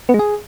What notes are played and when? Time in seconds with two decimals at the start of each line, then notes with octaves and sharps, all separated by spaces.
0.09 B3
0.14 G#3
0.19 G#4